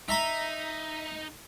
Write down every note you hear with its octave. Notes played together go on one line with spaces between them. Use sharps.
D#4 E5 A#5 B5